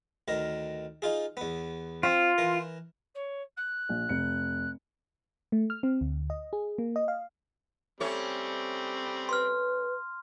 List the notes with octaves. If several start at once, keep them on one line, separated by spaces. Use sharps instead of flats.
D2 D#3 A#4
D#4 F4 G#4
E2 B3
C4 F4
E3 A#4
C#5
F#6
A#1
F1 C#7
A3
F6
C4
D2
D#5
G#4
A#3
D#5
F5
G3 A3 C4 C#4 C#5
B4 C6 F6